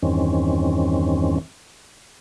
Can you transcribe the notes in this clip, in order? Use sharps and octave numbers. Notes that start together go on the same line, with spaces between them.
E2 G2 D#3 C4 C#4